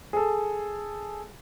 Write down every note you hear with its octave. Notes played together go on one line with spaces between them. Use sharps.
G#4 A4